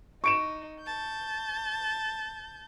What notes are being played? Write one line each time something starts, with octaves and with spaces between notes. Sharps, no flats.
D#4 C#6 D7 E7
A5 G6